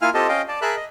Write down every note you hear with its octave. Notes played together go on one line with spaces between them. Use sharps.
A#3 E4 F4 F5 G#5 F6
C4 F4 G4 A4 D#5 A5
C#4 D#5 F5 G5
D5 A5
G#4 A#4 E5 A5 B5 F#6
D#5